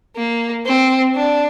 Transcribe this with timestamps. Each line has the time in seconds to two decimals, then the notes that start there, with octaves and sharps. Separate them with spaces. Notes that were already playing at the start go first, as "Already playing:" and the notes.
0.16 A#3
0.66 C4
1.15 D4